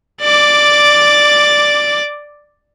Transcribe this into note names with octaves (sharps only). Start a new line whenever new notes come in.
D5 D6